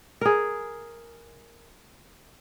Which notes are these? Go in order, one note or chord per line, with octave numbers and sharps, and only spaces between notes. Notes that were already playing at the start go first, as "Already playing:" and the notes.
G#4 A#4